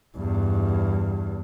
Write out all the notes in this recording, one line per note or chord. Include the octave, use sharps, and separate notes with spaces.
E2 G2